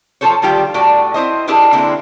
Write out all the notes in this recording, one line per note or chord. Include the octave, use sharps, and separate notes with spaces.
F3 C4 F4 A4 C5 C#5
D3 D#3 G3 F4 G4
A2 A3 F#4 D5
C4 E4 C5 D#5
D4 E4 G4 G#4 A#4 B4
D3 G#3 A#3 C4 E4